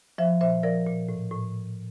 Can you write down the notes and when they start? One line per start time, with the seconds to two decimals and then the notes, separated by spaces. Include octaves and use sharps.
0.18 F3 C5 E5
0.41 A#2 C5 E5
0.63 F3 A#4 D5
0.86 A#2
1.09 A2
1.31 A2